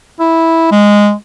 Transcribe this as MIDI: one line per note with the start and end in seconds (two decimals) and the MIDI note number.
0.20 0.68 64
0.71 1.13 56